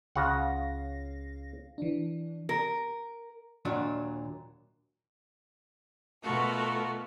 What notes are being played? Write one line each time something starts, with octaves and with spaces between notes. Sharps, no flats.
C#2 C#3 F4 F5 F#5 A#6
E3 D4
A#4
D#2 A#2 F#3 D4
B2 A3 F4 F#4 A4 A#4